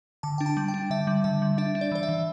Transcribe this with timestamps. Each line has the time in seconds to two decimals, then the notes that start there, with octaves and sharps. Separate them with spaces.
0.23 D3 A5
0.38 D4 G5
0.46 A5
0.57 G3
0.68 G5
0.74 D4
0.90 D3 E5
1.07 G3
1.24 D3 E5
1.42 G3
1.58 D4 E5
1.75 D4
1.81 D5
1.92 E3 D5
2.03 E5
2.09 E3